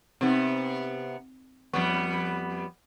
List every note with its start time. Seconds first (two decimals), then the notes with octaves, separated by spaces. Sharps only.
0.21 C3 B3 C4 D#4
1.73 F2 G3 B3 C#6